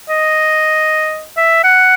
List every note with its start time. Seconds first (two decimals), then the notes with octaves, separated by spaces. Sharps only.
0.09 D#5
1.37 E5
1.64 F#5